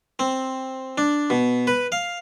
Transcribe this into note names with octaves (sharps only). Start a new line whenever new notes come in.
C4
D4
B2
B4
F5